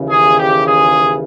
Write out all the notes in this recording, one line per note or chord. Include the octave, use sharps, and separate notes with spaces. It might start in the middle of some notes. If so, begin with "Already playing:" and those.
Already playing: D#2 C#3 E3
G#4
G4
G#4